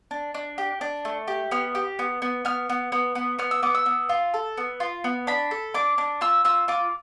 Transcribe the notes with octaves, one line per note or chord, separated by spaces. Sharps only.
D4
D4
G4
D4
A3
G4
B3 F6
G4
B3
B3
B3 F6
B3
B3
B3
B3 F6
E6
B3 D6
E6
B3
F4
A4
B3
F4
B3
D4 B5
A4
D4 D6
D4
F4 E6
F4 E6
F4 D6